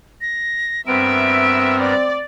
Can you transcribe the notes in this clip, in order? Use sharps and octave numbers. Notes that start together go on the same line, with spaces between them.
A#6
G2 B3 C4 A#4 E5 D7
D5